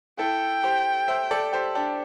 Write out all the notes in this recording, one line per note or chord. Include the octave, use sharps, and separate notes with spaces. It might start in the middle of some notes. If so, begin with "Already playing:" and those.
E4 A4 G5
G4 C5
C5 E5
A4 D5
G4 C5
D4 G4